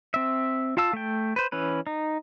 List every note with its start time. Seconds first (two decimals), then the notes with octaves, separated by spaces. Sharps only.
0.14 C4 E5
0.77 F4 F5 A5 E6
0.93 A3 G5
1.36 B4 C5
1.52 E3 C#4 B4
1.87 D#4